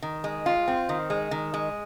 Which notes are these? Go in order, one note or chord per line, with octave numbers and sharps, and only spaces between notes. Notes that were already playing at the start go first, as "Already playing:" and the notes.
D#3
G#3
F4
C4
D#3
G#3
D#3
G#3